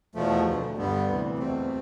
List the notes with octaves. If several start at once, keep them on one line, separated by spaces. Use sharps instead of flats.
E2 B2 F3 A3
D2 D3
G2 D3 G3 B3
D2 C3 E3
E2 B2 A3 C4